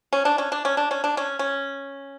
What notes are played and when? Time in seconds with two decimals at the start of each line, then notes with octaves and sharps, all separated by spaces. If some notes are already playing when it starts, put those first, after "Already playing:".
0.13 C#4
0.25 D4
0.38 C#4
0.52 D4
0.65 C#4
0.77 D4
0.91 C#4
1.04 D4
1.17 C#4
1.39 C#4